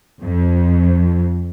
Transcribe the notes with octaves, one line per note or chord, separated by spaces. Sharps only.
F2